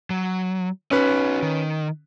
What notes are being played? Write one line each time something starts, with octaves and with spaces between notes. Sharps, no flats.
F#3
C#4 D#4 F#4 B4
D#3